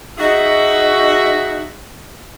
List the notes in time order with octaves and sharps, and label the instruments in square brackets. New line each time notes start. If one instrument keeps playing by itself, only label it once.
[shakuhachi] D#4 [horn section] F#4 G#4 E5